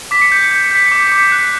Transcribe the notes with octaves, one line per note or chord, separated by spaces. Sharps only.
D6 B6
C#7
G6 B6
C#7
G6 B6
C#7
G6 B6
C#7
D6
B6
D6 C#7
B6
F#6 C#7
B6